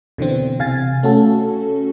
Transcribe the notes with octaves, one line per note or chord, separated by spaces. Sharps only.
B2 D3 E3 C4
C3 F5 G#5 A6
A3 C#4 F#4 A4